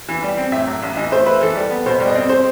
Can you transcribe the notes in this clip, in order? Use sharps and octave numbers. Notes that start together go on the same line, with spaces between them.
E3
G3
C4
A2 E5
F#3
A1
E3 D#5
A3 C5
E4 B4
E3 A4
G3
B3
B2 C5
G3
D#5
C4
C5